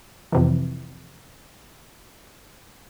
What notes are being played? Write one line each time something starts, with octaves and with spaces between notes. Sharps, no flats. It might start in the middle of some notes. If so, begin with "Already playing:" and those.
F2 C3 E3